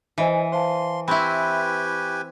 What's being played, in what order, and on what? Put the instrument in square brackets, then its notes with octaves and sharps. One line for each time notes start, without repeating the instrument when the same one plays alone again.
[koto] E3 [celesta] C5 D#5 G#5
[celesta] C5 F5 A5 [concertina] C6
[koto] C4 E4 [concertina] G4 B4 G#5 [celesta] B5 C#6